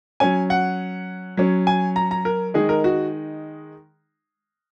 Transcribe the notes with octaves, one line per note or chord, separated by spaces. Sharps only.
F#3 C#4 G#5
F#5
F#3 C#4
G#5
A#5
A#5
A#4
D#3 G#3 D#4 G#4
A#4
F#4